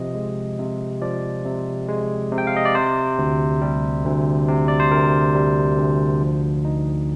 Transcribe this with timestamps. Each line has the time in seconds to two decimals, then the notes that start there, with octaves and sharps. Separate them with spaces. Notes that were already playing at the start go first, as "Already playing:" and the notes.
Already playing: C3 F3 D#5
0.15 G#3
0.59 C3
1.02 F3 D5
1.45 C3
1.88 G#3
2.32 C3
2.38 G5
2.47 F5
2.57 D#5
2.65 D5
2.75 C3 C5
3.18 D2
3.62 G3
4.05 D2
4.48 C3
4.68 D5
4.80 C5
4.91 D2 A#4
5.35 G3
5.79 D2
6.21 F3
6.65 D#4